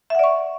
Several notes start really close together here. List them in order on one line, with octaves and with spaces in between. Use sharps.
E5 F#5 D5 C#6